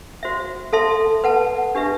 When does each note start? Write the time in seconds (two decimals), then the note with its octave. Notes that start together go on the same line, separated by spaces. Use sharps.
0.23 F#4 C5 E5
0.73 A4 E5 A5 C6
1.24 B4 F#5 A5
1.75 D4 G4 B4 E5